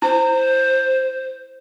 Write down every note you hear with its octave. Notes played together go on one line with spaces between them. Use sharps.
E4 C5